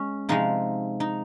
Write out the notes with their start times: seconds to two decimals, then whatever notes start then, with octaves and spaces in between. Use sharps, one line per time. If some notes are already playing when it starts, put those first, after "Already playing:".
Already playing: G#3 C#4
0.29 C3 F3 G#3 D#4
1.00 D#4